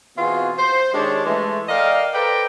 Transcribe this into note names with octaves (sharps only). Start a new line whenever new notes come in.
B2 E3 C4 F4 F#4 G#4
C5
D#3 G#3 D4 G4 C#5 A5
E3 G#3 A3
A4 A#4 D5 D#5 F5 G5
A4 B4 C5 D5 G5 A#5